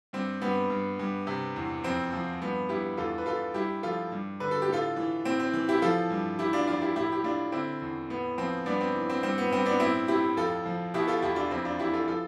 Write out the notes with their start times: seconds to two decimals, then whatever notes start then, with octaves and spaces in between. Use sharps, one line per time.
0.13 G2 C4
0.42 G2 B3
0.70 G2
0.99 G2
1.27 C3
1.56 E2
1.84 F2 C4
2.13 F3
2.41 G2 B3
2.69 G2 E4 G4
2.97 E2 F4 A4
3.18 B4
3.26 E2 F4 A4
3.54 G2 E4 G4
3.83 F3 F4 A4
4.12 G2
4.40 D3 B4
4.51 A4
4.62 G4
4.69 A2 F4 A4
4.96 E3
5.25 A2 C4
5.40 C4
5.53 E3
5.69 E4 G4
5.82 F3 F4 A4
6.10 G2
6.39 E3 E4 G4
6.53 D4 F4
6.67 F2 D4 F4
6.81 E4 G4
6.96 A2 E4 G4
7.12 G4
7.24 A2 D4 F4
7.52 D3 C4 E4
7.82 E2
8.10 A2 B3
8.38 F3 C4
8.66 G2 B3 D4
8.81 C4
8.94 E3
9.09 C4
9.23 G2 C4
9.38 B3
9.51 G2 C4
9.65 B3 D4
9.80 A2 C4 E4
10.08 A2 E4 G4
10.37 F2 F4 A4
10.65 F3
10.94 B2 E4 G4
11.08 F4 A4
11.22 E2 E4 G4
11.36 D4 F4
11.51 F2 C4 E4
11.65 D4 F4
11.79 E3 E4 G4
11.93 F4 A4
12.08 F3 F4 A4